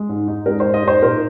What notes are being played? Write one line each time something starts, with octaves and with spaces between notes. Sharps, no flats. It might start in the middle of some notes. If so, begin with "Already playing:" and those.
Already playing: G#3
G#2
D#4
G#3 A#4
G#2 C5
D#5
D#4 C5
A#2 A#4